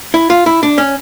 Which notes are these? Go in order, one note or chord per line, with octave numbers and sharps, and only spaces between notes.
E4
F4
E4
D4
C#4